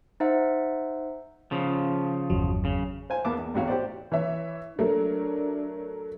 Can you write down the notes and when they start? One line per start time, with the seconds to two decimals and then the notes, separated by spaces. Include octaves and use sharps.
0.20 D#4 C5 E5 F#5
1.51 C#3 F3
2.30 G1 E2 F#3
2.65 C#3
3.10 C5 F5 G#5
3.25 E2 A#3 B3 F5 A5 D6
3.39 E2
3.54 A1 E2 C3 F#4 C#5 F5
3.68 G4 C5 D5
4.12 E3 C#5 E5
4.79 F#3 A3 D4 A#4